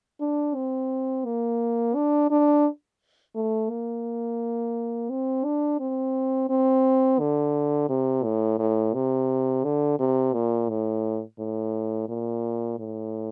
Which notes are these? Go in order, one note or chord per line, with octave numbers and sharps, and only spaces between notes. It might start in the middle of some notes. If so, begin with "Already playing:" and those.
D4
C4
A#3
D4
D4
A3
A#3
C4
D4
C4
C4
D3
C3
A2
A2
C3
D3
C3
A#2
A2
A2
A#2
A2